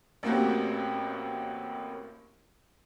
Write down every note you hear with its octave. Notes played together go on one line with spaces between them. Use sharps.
A1 A2 A#3 C4 F#4 G4